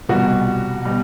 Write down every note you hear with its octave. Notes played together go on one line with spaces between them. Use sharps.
C2 B2 G3 F#4
B2 G3